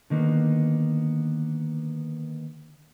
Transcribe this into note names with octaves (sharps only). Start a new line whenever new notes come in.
D3 D#3 A#3 B3